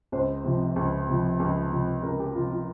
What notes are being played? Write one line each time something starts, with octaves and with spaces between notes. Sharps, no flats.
C#2 C5
C3 F3
C#2
C3 F3
C#2
C3 F3
C#2 A#4
G4
C3 F3 F4
F4